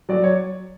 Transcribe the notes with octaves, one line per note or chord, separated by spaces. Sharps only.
F#3 D5
C#5